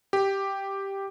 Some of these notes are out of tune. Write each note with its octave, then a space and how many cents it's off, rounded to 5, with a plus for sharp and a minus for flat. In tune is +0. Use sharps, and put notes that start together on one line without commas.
G4 +0